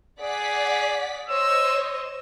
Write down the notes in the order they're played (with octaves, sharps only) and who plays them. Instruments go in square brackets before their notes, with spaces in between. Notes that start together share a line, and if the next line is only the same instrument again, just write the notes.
[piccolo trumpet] G#4 [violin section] D5 F#5 B6
[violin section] C5 C#5 D#5 [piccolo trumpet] E6